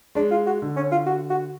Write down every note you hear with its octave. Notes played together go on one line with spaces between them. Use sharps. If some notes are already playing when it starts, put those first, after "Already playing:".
G#3 D4
F4
F#4
D3
C#4
F4
F#4
F#4